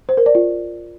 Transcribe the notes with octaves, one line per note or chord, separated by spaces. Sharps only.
C5
A#4
D5
F4